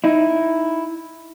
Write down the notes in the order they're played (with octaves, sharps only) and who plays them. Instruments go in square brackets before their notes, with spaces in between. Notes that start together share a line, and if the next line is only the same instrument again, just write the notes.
[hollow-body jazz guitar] D#4 E4